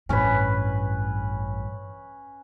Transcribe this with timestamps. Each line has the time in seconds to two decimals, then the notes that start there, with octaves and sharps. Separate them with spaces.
0.09 A1 G2 C#4 B4